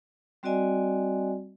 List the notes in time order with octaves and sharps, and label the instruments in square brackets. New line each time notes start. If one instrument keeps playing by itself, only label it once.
[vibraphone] G3 C4 F#4 D5 D#5 G#5